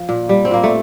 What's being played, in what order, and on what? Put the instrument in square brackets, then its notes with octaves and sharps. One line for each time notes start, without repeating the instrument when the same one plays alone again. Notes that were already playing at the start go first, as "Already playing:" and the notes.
Already playing: [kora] F3
A#2
G3
C4
A#2 A#3
A3